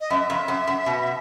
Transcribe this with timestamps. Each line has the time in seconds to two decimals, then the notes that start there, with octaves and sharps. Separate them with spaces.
0.01 D#5
0.10 F#2 E5
0.30 F2
0.48 F#2
0.67 F#2
0.86 B2